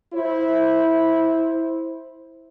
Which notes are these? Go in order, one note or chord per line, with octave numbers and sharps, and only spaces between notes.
E4 C5